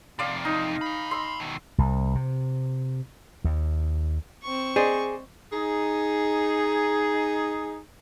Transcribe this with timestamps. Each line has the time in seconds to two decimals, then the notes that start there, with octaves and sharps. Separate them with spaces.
0.19 F2 C3 D5 F5
0.45 D#4
0.81 G#5 B5
1.11 C6 E6
1.40 B2 D#3
1.78 C2
2.15 C3
3.44 D#2
4.43 C4 C#6
4.76 G#4 C5 D5 D#5
5.53 D#4 G#4